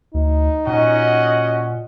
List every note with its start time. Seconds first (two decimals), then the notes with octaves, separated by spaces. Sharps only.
0.14 D2 D#4
0.67 A#2 C#4 F#4 D#5 F#5